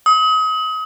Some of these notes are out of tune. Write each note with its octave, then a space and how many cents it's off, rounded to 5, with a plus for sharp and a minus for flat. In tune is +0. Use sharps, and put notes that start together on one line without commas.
D#6 +35